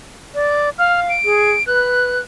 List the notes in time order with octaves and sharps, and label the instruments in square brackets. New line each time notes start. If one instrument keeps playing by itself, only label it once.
[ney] D5
[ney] F5 [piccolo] F6
[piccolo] D7
[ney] G#4
[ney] B4 [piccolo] F#6